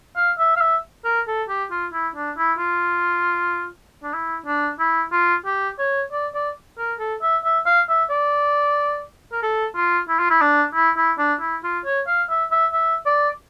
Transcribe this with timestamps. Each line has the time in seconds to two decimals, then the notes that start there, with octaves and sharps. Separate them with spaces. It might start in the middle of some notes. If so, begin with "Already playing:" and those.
0.16 F5
0.39 E5
0.56 F5
0.61 E5
1.05 A#4
1.27 A4
1.49 G4
1.71 F4
1.93 E4
2.16 D4
2.38 E4
2.59 F4
4.03 D4
4.14 E4
4.46 D4
4.80 E4
5.12 F4
5.45 G4
5.79 C#5
6.12 D5
6.34 D5
6.78 A#4
6.99 A4
7.22 E5
7.44 E5
7.66 F5
7.89 E5
8.10 D5
9.32 A#4
9.42 A4
9.76 F4
10.09 E4
10.19 F4
10.30 E4
10.41 D4
10.75 E4
10.97 E4
11.18 D4
11.41 E4
11.63 F4
11.85 C#5
12.07 F5
12.30 E5
12.51 E5
12.73 E5
13.06 D5